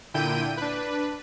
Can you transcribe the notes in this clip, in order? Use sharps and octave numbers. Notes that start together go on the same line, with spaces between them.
A#2 D3 E4 G5 G6 D#7
D4 B4